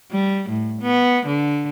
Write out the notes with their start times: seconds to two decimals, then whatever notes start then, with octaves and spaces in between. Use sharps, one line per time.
0.11 G3
0.49 A2
0.82 B3
1.26 D3